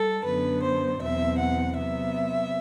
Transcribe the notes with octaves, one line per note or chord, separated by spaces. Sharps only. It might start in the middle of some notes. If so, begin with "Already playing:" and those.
Already playing: G3 A4
F#2 D3 F#3 B3 B4
C5
E2 B2 F#3 C4 E5
F#5
C3 F#3 B3 E5